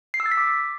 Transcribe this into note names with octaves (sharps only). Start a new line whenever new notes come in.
C7
E6
A6
B6
D6